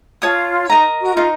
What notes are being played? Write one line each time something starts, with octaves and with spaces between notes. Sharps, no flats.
F4 C#5 A5 D#6
D#4 A#4 D#5 A#5
F#4
D#4 F4 A#4 D#5